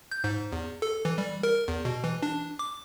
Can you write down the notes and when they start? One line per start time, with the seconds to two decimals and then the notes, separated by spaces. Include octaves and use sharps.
0.12 G6
0.24 G#2
0.52 E2
0.82 A4
1.05 E3
1.18 G3
1.43 A#4
1.68 E2
1.85 B2
2.04 E3
2.23 D4
2.59 D6